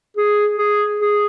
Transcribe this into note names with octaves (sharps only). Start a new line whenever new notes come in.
G#4
G#4
G#4